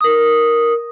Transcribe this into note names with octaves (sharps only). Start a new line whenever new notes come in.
A#4 D#6